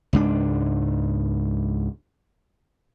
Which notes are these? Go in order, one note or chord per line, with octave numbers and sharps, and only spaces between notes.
C#2 G#2 D4